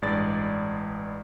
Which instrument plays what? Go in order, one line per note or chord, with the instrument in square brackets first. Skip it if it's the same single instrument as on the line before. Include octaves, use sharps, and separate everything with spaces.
[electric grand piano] A1 G2 G#3 G#4 D5 A6